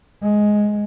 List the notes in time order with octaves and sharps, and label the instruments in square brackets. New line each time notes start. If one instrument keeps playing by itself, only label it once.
[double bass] G#3